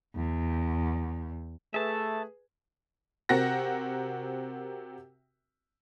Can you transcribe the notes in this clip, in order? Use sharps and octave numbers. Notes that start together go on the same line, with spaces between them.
E2
A3 G#4 B4 E5 A5
C3 C4 F#4 A#4 F#5 A#6